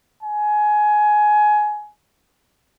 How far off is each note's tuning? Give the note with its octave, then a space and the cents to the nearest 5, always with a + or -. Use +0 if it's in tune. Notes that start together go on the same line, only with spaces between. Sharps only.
G#5 +20